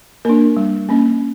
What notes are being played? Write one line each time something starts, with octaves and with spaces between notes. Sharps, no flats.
A#3 D4 A#4
G3
A#3 C#4